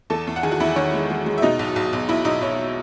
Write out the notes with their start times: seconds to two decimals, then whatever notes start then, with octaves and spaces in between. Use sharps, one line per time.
0.10 E2 A4 A5
0.27 E2
0.36 F#5
0.43 D#3 G#4 G#5
0.51 F#4 F#5
0.60 E2 E4 E5
0.76 D#3 C#5
0.94 G#3
1.10 G#3
1.26 G#3
1.38 E5
1.42 B2 D#4 D#5
1.59 B1
1.76 B1
1.93 B1
2.09 B1 E4 E5
2.25 B1 D#4 D#5
2.41 B1 C#5